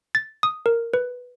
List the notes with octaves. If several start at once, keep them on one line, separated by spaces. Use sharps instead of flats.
A6
D#6
A#4
B4